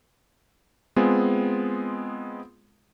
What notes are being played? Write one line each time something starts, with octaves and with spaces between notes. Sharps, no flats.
G#3 B3 C4 F4 G#4